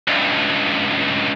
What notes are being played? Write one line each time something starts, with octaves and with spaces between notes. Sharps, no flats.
C#2 G2